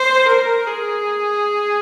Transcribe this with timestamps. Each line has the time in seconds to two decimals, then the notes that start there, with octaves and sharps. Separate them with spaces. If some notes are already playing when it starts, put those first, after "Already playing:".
Already playing: C5
0.27 A#4
0.67 G#4